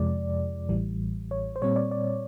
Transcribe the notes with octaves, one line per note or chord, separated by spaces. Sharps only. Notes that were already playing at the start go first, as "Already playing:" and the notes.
Already playing: F2 C3 F3 G#3 D5
A1 A2 E3 G3
C#5
C5
A#2 G3 C4 C#5
D5
D5